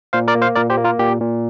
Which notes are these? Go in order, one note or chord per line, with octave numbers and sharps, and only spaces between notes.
A#2 C5 F5
A#4 D5
A#3
C5 F5
A#2 A#4 D5
G4 C5
A#3
F4 A#4
A#2 G4
A#2